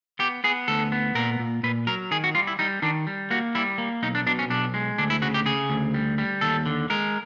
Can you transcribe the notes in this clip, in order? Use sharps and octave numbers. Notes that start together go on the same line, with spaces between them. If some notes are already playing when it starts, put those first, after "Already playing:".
B3 G4
B3 G#4
D2 A4
B3
A#2 A#4
A#2
A#2 B4
F#3 A#4
D#3 G#4
F#4
G3 F4
E4
G3 D#4
D#3 D4
G3
A#3 F#4
G3 E4
A#3
B1 D#4
D4
B2 D4
C#4
B1 D4
G#3
D2 D4
E4
C#3 F#4
G4
C#3 G#4
D2
G3
G3
D#2 A4
D3
G#3 A#4